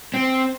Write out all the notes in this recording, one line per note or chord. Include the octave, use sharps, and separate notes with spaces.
C4